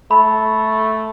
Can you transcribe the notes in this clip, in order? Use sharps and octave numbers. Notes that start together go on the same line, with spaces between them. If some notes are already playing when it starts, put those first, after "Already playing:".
A3 B5